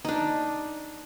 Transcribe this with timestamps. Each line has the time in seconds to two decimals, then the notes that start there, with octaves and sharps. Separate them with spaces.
0.05 D4 D#4